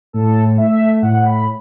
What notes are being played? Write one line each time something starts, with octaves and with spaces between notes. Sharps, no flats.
A2 A4
A3 E5
A2 F#5
B5